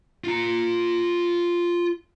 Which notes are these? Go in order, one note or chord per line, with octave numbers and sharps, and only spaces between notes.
F4 A#5